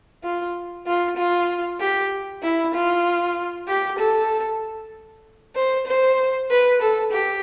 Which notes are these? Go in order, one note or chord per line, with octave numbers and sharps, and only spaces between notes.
F4
F4
F4
G4
E4
F4
G4
A4
C5
C5
B4
A4
G4